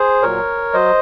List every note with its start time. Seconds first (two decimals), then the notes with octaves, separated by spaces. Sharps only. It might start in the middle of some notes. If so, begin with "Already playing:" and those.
Already playing: G#4 C5
0.22 A#2 F#3 A#4 C#5
0.74 F#3 C5 D#5